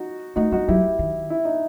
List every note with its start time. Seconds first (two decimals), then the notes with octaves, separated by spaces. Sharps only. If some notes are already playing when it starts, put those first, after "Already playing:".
Already playing: D#4 F#4
0.36 A3 D#4 F#4
0.52 G3 D#4 F#4
0.68 F#3 E4 G4
0.99 D#3
1.30 E4
1.45 D#4